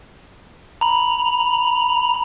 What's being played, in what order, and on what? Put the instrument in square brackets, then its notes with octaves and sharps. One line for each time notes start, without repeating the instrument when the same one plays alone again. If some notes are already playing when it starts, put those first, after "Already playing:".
[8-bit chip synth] A#5 B5